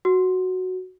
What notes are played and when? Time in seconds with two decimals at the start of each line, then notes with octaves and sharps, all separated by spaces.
0.05 F#4